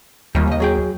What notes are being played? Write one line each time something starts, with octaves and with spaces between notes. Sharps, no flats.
D#2 D#3 G3
C#2 D#5
F#3 G#4 G5